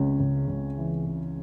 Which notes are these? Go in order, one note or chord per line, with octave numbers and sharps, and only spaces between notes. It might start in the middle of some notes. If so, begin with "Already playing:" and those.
Already playing: C#2 C#3 C#4
C#2
C#2
E3
C#3